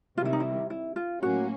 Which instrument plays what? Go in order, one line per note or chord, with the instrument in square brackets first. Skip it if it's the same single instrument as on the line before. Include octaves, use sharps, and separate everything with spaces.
[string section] C3 D#3 G3 [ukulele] F4
[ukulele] E4
D#4
E4
E4
F4
[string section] A2 F#3 A#3 C#4 [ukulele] F#4